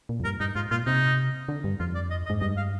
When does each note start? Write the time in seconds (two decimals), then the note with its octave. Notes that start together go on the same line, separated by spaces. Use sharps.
0.09 A#2
0.20 F2
0.24 G2 A#4
0.40 G2 D#4
0.56 G#2 F4
0.71 A#2 F4
0.86 C3 D#4
1.48 D3
1.64 G2
1.80 F2 F4
1.95 D5
2.11 D#5
2.26 D#5
2.30 G#2
2.41 G2 D#5
2.57 F5